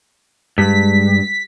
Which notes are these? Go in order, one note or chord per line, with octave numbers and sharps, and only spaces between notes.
G2 G3 G#3 B6